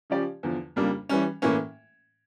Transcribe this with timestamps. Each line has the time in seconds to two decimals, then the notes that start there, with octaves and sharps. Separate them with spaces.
0.10 C#3 F3 C#4 G4 D5
0.43 E2 D3 F3
0.76 F2 C#3 G3 A#3 D4
1.09 E3 G3 C#4
1.42 A2 E3 A#3 C#4